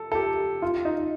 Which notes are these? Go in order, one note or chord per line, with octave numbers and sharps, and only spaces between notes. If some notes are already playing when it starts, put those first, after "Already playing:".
Already playing: A4
A4
G4
F4
D#4